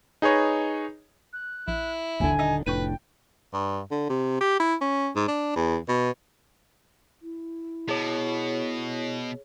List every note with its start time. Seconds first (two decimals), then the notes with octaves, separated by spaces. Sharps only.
0.22 D#4 G#4 B4 C#5 D#5
1.33 F#6
1.68 A#1 E4
2.20 D#1 A1 D#2 D3 G#5
2.39 D#4 E5 E6 D#7
2.66 F1 A2 D4 B4 G5 C#6 G6 D#7
3.54 G2
3.91 D3
4.10 C3
4.41 G4
4.60 E4
4.81 C#4
5.16 G#2
5.28 D4
5.56 E2
5.89 B2
7.21 E4
7.89 B2 G#4 C#5